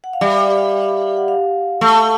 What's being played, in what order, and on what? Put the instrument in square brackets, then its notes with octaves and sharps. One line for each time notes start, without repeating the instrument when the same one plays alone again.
[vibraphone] F#5
F5
[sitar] G3 [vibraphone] E5
[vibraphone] F#5
F5
[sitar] A3